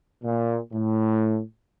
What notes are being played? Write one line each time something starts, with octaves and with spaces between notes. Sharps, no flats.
A#2
A2